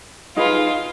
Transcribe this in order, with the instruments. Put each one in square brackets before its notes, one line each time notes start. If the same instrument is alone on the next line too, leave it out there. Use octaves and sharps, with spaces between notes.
[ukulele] D#4 G#4 B4 [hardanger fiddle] F4